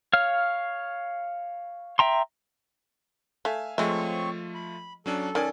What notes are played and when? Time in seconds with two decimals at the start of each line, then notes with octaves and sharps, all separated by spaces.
0.13 C#5 F5 F6
1.99 E5 G5 A#5 C6
3.45 A3 E5 F5 G#5
3.78 F3 G#3 A3 C4 F4 C#5 E5 C#6
4.55 B5
5.06 F#3 C#4 D4 A4
5.35 D#3 C#4 D5 G#5